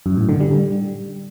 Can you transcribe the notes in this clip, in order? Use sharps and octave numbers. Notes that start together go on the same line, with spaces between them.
F#2
A2
D3
G3